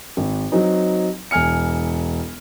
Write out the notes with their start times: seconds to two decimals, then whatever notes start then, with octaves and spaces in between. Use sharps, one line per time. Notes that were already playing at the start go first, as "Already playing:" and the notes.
0.17 G#1
0.52 F#3 C4 D#4
1.31 E1 G#5 F6 C#7